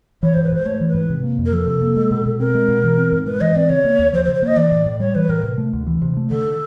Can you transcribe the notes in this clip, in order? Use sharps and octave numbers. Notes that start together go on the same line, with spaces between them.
E3 C#5
G#2 C5
B4
G#2 C5
A3 C#5
E3
B4
G#2
C3
A#3
F2
A#4
F3 A4
C3
A#3
G#3
B2
B2
C4 A#4
G#3
B2
E3
C4
G#2
G#3 B4
E3 D#5
C4 D5
C#3 C#5
A#3
D#2
F3 C5
C5
C#3
C5
A#3 D#5
E3 D5
A2
A2
G3 C#5
E3 B4
A2 A#4
C3
A3
D2
E3
C3
A3
D3 A4